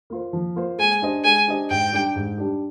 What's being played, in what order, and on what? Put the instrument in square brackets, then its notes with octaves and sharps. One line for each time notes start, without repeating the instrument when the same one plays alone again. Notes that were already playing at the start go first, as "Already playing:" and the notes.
[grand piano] A#3 F4 C5
F3
A#3 F4 C5
[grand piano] G#3 [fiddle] G#5
[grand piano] D4 G4 C5 D#5
[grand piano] G#3 [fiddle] G#5
[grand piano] D4 G4 C5 D#5
[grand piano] G#2 [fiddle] G5
[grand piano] G3 D4 G4
G#2
G3 D4 G4